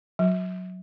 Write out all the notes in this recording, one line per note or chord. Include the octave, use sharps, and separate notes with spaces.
F#3